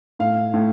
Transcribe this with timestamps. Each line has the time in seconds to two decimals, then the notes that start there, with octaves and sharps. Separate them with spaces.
0.19 A2 F5
0.54 A2